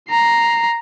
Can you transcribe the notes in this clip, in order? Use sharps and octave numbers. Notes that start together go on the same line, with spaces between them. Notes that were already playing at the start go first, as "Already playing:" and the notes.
A#5 C7